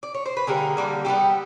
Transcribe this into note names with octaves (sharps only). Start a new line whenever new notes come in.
D5
C#5
C5
B4
D3 G3 A#3 G#4 A#4
D3 G3 A#3
D3 G3 B3 G4 A4